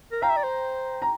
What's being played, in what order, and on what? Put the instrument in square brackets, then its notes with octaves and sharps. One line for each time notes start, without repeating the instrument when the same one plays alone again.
[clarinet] A#4
[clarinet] F5 [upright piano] G5 A#5
[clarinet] E5
D5
C5
[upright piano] A#5